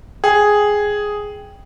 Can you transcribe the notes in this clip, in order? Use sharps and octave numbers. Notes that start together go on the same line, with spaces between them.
G#4 G5